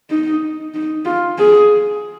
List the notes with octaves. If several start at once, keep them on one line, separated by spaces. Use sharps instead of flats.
D#4
D#4
F4
G#4